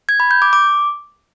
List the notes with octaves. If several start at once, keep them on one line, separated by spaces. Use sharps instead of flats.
G#6
B5
G6
D6
D6